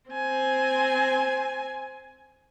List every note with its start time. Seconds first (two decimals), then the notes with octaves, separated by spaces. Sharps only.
0.10 C4 G#5